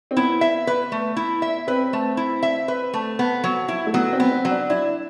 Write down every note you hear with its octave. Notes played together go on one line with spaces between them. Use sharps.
C4
B3 E4
E5
B4
A3
E4
E5
C4 B4
A3
E4
E5
B4
A3
B3
F#3
E4
A3
F#3 B3
C4
B3
C4
F#3
D4
D4 E4